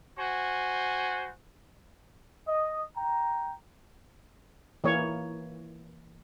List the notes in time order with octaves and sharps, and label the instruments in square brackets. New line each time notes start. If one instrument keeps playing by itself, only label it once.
[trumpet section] F#4 C5 G#5
D#5
G5 A#5
[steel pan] E3 A#3 C#5